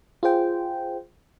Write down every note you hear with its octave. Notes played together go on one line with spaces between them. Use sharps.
F4 G#4 C5 G5